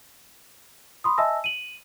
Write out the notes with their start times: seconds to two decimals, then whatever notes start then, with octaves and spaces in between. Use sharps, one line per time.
1.04 B5 C6 D#6
1.18 D#5 E5 G#5 A5 E6 A#6
1.44 D#7 F#7